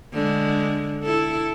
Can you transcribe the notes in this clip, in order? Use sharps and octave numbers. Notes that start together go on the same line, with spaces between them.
D3 G#3
E4 A4